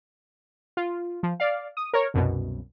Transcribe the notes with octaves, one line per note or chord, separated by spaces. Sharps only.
F4
F3
D5 F5
D#6
A#4 C#5
C2 F#2 B2